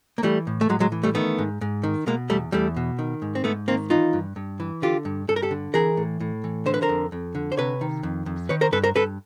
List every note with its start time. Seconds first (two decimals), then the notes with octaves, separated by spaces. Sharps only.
0.18 A#3
0.23 E3 G3 A3
0.47 A2
0.61 A3
0.69 A2 F#3 G#3
0.80 F#3 G#3
0.92 E3
1.03 G3 A3
1.15 D#3 A3 B3
1.39 G#2
1.61 G#2
1.83 D#3
2.06 B2 G#3 A#3
2.29 E2 G3 A3
2.52 E2 G3 A3
2.77 B2
2.99 D#3
3.22 G#2
3.35 C4
3.44 G#2 A3 B3
3.68 D#3 A#3 C4
3.90 E3 D#4 F4
4.13 G2
4.36 G2
4.60 E3
4.82 D3 F4 G4
5.05 G2
5.28 G2 A4
5.36 A#4
5.42 G4 A4
5.51 D3
5.74 E3 G#4 A#4
5.97 A2
6.20 A2
6.44 E3
6.66 D3 C5
6.74 B4
6.82 A#4 C5
6.89 F2
7.12 F2
7.35 D3
7.52 C5
7.57 C3 B4 C#5
7.81 D#3
8.03 F2
8.26 F2
8.49 D#3 B4 C#5
8.61 A#4 C5
8.72 G2 A4 B4
8.84 A#4 C5
8.95 G2 A4 B4